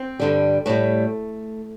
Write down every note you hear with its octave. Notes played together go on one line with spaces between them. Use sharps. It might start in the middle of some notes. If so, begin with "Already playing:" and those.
Already playing: C4
G2 D3 G3
A2 G3 A3